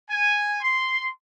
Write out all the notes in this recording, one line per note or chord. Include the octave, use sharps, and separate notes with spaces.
G#5
C6